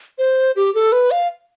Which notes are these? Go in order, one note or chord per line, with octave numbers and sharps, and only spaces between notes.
C5
G4
A4
B4
F5